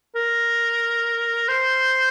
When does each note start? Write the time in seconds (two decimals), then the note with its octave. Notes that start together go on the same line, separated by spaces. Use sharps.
0.16 A#4
1.49 C5